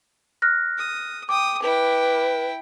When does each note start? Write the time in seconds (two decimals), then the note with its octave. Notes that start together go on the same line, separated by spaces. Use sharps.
0.42 F6 F#6 A#6
0.78 D#6
1.29 G5 D6 D#6
1.62 E4 B4 G5